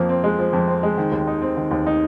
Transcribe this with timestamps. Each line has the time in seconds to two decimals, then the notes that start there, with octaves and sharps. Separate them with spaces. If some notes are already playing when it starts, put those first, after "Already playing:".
Already playing: F2 F3 A#3
0.09 C4
0.24 G#3
0.39 F3
0.53 F2
0.68 C4
0.83 G#3
0.98 D#3
1.12 D#2
1.27 D#4
1.42 C4
1.57 D#3
1.71 D#2
1.87 D#4